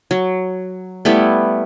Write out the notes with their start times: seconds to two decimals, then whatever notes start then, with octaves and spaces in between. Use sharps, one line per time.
0.11 F#3
1.05 G3 A3 B3 E4